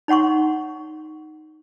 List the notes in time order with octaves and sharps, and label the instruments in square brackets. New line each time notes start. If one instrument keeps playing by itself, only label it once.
[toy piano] D#4 C#5 F#5 C6 C#6